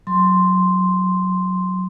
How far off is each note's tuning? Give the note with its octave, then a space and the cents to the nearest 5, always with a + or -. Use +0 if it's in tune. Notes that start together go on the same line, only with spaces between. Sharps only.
F#3 -5 C6 +0